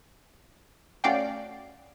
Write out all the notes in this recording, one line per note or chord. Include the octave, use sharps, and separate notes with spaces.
A3 C#4 F#4 D5 F5 G5